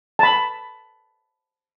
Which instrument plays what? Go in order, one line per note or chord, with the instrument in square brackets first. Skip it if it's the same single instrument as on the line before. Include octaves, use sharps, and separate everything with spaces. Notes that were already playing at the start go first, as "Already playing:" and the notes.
[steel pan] A5 B5